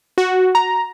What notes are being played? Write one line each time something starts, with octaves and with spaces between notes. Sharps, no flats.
F#4
A#5